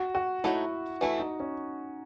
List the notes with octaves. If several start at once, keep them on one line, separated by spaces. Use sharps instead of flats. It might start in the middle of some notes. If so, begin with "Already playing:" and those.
Already playing: F#4
F#4
A3 D#4 E4 F#4 C#5
E3 A3 E4 F#4
D#4
C#4